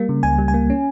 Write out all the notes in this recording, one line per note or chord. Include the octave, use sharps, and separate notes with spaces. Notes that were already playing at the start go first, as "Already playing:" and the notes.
Already playing: G3 A#3
C#3
C#2 G#5
G3
G#5
A#3
C#4